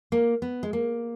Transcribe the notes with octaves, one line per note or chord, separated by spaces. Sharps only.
A#3
B3
G#3
A#3